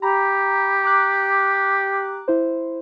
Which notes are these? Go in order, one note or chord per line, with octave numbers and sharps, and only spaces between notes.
G4 A#5 B5
A#5 D6 F#6
E4 C5